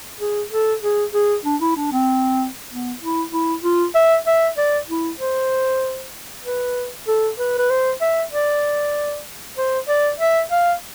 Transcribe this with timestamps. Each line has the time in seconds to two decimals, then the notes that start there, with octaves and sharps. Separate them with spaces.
0.21 G#4
0.52 A4
0.83 G#4
1.14 G#4
1.45 D4
1.61 E4
1.77 D4
1.92 C4
2.71 B3
3.02 E4
3.33 E4
3.64 F4
3.95 E5
4.27 E5
4.57 D5
4.89 E4
5.20 C5
6.45 B4
7.08 A4
7.39 B4
7.58 B4
7.70 C5
8.01 E5
8.33 D5
9.58 C5
9.88 D5
10.20 E5
10.51 F5